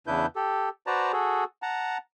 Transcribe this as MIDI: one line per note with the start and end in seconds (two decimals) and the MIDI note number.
0.07 0.26 40
0.07 0.26 49
0.07 0.26 62
0.07 0.26 64
0.07 0.26 71
0.07 0.26 91
0.36 0.69 67
0.36 0.69 69
0.87 1.12 66
0.87 1.12 71
0.87 1.12 72
0.87 1.12 74
0.87 1.12 81
0.87 1.12 82
1.13 1.44 66
1.13 1.44 68
1.13 1.44 69
1.62 1.98 78
1.62 1.98 81
1.62 1.98 82